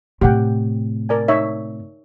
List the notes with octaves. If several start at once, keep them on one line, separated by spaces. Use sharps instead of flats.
A2 C3 G4 F#5 G5
A#4 D5 G#5
D#4 C#5 E5